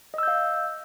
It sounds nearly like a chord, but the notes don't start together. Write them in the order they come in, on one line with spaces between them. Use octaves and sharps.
D#5 E6 G6 F5